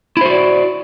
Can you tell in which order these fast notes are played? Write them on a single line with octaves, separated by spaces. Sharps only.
E4 C5 F#4 D5